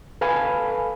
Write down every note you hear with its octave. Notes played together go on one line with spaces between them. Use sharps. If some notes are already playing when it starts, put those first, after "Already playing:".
A4 B4 F5 G#5 B5